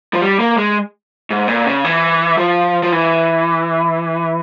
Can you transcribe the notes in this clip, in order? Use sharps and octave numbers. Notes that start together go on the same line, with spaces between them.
F3
G3
A#3
G#3
G#2
A#2
C#3
E3
F3
F3
E3